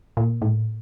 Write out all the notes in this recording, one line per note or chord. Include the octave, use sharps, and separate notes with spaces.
A#2
A2